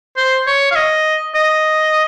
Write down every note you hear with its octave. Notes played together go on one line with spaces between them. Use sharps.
C5
C#5
F5
D#5
D#5